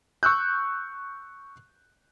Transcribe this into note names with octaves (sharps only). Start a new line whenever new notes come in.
C#6 E6 F#6 G6